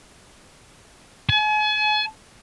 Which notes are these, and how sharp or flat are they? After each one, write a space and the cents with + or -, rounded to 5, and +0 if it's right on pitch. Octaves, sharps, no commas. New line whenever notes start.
G#5 +40